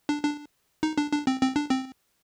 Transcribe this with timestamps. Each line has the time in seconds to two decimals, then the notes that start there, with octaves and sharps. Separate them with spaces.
0.09 D4
0.23 D4
0.83 D#4
0.98 D4
1.12 D4
1.27 C4
1.42 C4
1.56 D4
1.70 C4